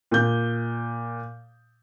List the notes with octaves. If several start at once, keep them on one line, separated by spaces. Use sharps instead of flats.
A#2 G6